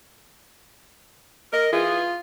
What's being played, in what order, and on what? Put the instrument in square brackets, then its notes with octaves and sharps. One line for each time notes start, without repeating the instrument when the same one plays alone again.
[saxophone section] A#4 [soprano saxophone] D#5
[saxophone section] E3 G#4 [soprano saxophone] F4